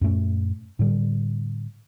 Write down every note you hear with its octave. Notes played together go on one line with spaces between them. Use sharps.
F#2 A#2 A3 C#4
A2 D3 G3